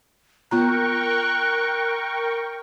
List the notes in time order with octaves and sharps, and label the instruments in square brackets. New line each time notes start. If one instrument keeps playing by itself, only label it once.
[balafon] B3 F4 A#5 [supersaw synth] A#4 G5 C#6 [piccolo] F#6